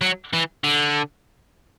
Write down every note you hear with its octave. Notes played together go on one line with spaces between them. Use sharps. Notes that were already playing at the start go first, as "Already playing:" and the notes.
F#3
E3
D3